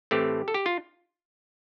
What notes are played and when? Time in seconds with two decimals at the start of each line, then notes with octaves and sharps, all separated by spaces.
0.11 A2 E3 A3 C4 G4
0.48 A4
0.54 G4
0.66 F4